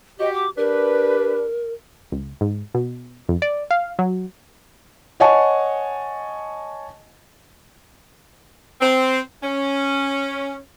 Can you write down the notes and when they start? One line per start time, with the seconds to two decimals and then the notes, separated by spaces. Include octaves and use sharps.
0.20 F#4 G4 D#5
0.34 D6
0.58 D4 G4 A#4 B4
2.12 C#2
2.41 G#2
2.74 B2
3.29 F2
3.42 D5
3.71 F5
3.99 F#3
5.20 C#5 D#5 F#5 G#5 A5 C#6
8.81 C4
9.43 C#4